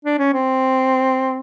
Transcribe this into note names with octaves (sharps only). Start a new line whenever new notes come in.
D4
C#4
C4